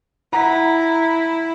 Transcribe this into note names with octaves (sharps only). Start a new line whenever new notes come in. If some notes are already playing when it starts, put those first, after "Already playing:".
E4 F#5 A#5